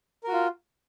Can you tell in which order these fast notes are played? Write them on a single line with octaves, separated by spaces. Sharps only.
A#4 F#4 F4